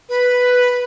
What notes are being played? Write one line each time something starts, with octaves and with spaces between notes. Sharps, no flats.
B4